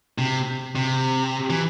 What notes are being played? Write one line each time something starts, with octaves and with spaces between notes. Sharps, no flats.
C3
C3
E3